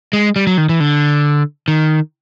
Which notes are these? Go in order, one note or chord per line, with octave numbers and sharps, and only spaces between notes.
G#3
G3
F#3
D#3
E3
D3
D#3